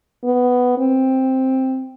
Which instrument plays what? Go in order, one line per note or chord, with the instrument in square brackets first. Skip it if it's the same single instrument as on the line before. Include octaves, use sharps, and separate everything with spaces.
[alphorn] B3
C4